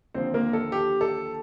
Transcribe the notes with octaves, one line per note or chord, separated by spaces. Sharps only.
D#2 D3 F3 C4 C5
A#3 A#4
A4
G4
A4